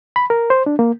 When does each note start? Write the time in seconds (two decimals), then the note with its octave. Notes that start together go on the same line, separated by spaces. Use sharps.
0.16 B5
0.30 A#4
0.50 C5
0.66 D4
0.79 A#3